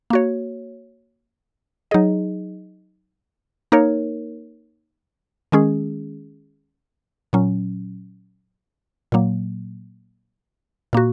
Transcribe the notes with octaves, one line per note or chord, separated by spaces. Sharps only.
A#3 F#4 C#5
F#3 D#4 G#4 D#5
A#3 D#4 A#4 C#5
D#3 G#3 C#4 G#4
A#2 F#3 C#4
A#2 F#3 A#3
A#2 A#3 F#4